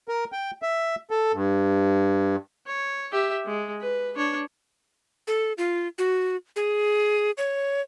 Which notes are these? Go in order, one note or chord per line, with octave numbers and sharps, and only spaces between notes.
A#4
G5
E5
A4
G2
C#5
G4 E5
G#3
B4
D4 C#5
A4
F4
F#4
G#4
C#5